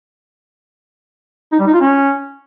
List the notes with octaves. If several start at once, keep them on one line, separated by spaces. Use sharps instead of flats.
D#4
G3
D#4
F4
C#4